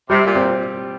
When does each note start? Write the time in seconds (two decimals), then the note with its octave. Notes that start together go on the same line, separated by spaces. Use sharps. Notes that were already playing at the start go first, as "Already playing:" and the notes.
0.09 C3 G3
0.26 A#2
0.35 C4 G4